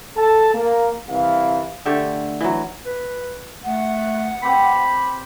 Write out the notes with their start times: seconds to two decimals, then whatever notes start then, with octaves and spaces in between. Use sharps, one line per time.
0.17 A4 A5
0.55 A#3
1.10 C2 E3 F5
1.86 D3 A3 G4 A4
2.41 E3 F#3
2.86 B4
3.64 A3 F#5
4.42 C4 G4 C5 B5